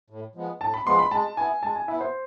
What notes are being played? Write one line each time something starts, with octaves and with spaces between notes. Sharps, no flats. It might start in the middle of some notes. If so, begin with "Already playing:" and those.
A2
F3 G#3 B3
A2 A5
B5
F3 G#3 B3 C6
B5
G#3 A5
B3 E4 G#5
G#3 A5
G#5
B3 E4 E5
C5